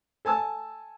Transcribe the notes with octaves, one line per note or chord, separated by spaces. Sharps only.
A4 G#5 A5 E6